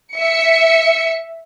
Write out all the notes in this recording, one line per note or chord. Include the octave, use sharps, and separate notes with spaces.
E5 C#7